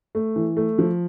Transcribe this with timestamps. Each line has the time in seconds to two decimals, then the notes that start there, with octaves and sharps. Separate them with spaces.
0.15 A3
0.36 E3
0.57 A3
0.79 F3